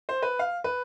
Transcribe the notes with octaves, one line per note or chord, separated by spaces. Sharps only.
C5
B4
F5
B4